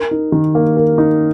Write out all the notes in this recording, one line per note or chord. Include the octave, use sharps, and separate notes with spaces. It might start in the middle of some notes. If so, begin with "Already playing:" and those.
Already playing: A#4
D#4
D#3
A#3
A#4
D#4